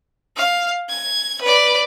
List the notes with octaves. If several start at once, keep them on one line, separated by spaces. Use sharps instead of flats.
F5
G#6
B4 D5